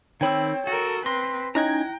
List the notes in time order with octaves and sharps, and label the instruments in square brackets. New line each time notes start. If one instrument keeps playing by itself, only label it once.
[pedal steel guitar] D#3 B5 E6 [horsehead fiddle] C4 [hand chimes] C#5 G5 G#6
[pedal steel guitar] F#4 [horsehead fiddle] A4 A#4
[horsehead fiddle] C4 B4 [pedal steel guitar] C6 [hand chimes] A#6
[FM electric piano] C#4 D#4 G#6 [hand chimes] E4 A#6 [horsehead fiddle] G5 [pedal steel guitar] A#5 F#6